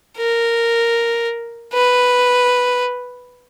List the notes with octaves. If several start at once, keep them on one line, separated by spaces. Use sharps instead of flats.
A#4
B4